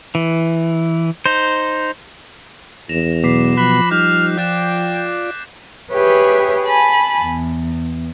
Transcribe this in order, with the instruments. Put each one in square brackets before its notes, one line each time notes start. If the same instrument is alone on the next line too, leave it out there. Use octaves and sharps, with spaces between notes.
[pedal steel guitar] E3
D#4 C5
[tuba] E2 [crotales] A#6 E7 F7
[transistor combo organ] B2 F#3 B3 [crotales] D6 B6 C7
[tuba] F3 [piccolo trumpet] B5 [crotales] F#6
[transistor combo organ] G3 D#4 [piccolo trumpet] F6 [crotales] G6
[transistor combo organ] F4 D5 [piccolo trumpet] G5 [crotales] F#6 A6 E7
[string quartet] G4 G#4 B4 C#5 E5 G5
G#5 A5 B5
E2